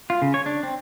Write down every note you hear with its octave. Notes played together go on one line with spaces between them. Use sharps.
F4
C#3
C#5
D4
C4